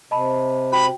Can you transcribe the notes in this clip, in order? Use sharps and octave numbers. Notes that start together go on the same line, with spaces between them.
C3 D#5 A5 B5
F#4 G5 B5